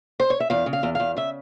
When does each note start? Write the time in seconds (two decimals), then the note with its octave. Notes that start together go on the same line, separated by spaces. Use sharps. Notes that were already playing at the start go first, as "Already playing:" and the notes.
0.20 C5
0.30 C#5
0.40 E5
0.50 E2 F5
0.66 C#3
0.73 F5
0.83 E2
0.95 E2 F5
1.17 C#3 E5